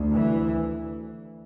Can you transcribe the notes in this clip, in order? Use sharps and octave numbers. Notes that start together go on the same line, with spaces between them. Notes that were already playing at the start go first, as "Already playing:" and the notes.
Already playing: D2
E3